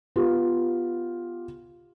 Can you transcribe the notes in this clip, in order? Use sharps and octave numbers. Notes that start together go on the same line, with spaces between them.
B3 F4 G4